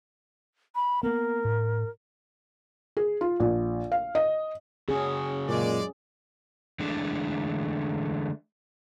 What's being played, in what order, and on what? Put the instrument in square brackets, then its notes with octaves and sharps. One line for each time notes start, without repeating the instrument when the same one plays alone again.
[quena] B5
[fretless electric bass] A#3 B3 [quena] A#4
[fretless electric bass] A2
[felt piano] G#4
F4
A#1
F5
D#5
[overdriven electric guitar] C#3 F#4 [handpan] C#4 G#4
[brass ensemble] F#2 G#3 D5 [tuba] A#2
[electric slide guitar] D3 E3 G#3 A3 D4